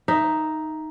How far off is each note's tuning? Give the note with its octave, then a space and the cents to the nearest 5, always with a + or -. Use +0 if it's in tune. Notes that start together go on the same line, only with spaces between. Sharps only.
D#4 +0 E5 +5